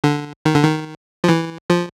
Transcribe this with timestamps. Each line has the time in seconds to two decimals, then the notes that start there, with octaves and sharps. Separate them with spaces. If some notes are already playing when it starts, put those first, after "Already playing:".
0.04 D3
0.45 D#3
0.55 D3
0.63 D#3
1.24 F3
1.29 E3
1.70 F3